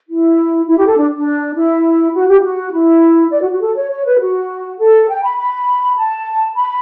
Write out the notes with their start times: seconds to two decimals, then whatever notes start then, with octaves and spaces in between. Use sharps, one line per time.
0.09 E4
0.67 E4
0.78 G4
0.86 A4
0.97 D4
1.16 D4
1.55 E4
2.14 F#4
2.28 G4
2.39 E4
2.43 F#4
2.72 E4
3.31 D5
3.41 F#4
3.51 F#4
3.61 A4
3.76 C#5
3.91 C#5
4.04 B4
4.20 F#4
4.78 A4
5.08 G5
5.23 B5
5.37 B5
5.96 A5
6.54 B5